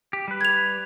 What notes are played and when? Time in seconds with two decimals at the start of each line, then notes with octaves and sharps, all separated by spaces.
0.13 G4
0.28 G3 B4
0.41 G#6 F7